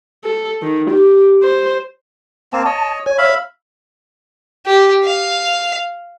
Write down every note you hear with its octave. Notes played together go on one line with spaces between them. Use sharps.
A4
D#3
G4
C5
A#3 C4 A5
C#5 D#5
C#5 G#5
E5 F5 B5
G4
F5